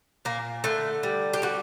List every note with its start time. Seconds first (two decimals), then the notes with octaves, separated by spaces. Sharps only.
0.25 A#2 A#3
0.64 D3 A3
1.03 G3
1.33 G4
1.42 G3 F#4